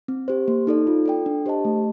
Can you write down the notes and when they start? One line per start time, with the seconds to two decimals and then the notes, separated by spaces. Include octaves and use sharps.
0.08 C4
0.28 G4 C5
0.48 A#3
0.67 D#4 A4 D5
0.87 F4
1.06 A4 D5 G5
1.26 D4
1.46 G4 C5 D#5 A5
1.65 A3